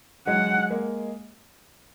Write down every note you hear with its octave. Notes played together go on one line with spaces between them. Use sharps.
F#3 G#3 F#5
G#3 A#3